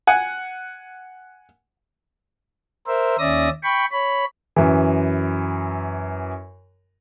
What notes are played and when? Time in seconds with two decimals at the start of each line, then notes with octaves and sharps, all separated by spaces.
0.07 F#5 G#5
2.87 A#4 C5 E5
3.19 D#2 C#4 D5 E5 D#6 A#6
3.63 G5 B5 C#6
3.92 C#5 B5
4.56 F#2 E3